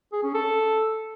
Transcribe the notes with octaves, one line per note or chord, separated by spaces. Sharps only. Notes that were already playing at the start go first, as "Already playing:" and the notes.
G#4
C#4
A4